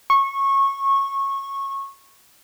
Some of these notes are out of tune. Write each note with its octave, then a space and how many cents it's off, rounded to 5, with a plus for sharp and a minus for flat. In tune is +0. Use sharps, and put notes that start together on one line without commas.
C#6 -20